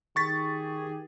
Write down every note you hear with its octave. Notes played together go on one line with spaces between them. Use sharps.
D#3 G4 G#4 C#6 A6 B6